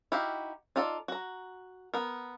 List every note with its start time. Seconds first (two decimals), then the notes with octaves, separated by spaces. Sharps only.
0.12 D#4 E4 F#4 G4 F5
0.76 D#4 F4 A4 D5
1.08 F#4 A#5
1.94 B3 A#4